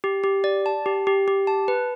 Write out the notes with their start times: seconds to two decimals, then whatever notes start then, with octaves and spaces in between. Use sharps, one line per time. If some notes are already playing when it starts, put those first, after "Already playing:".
0.04 G4
0.24 G4
0.44 D5
0.66 A5
0.86 G4
1.07 G4
1.28 G4
1.47 A5
1.68 B4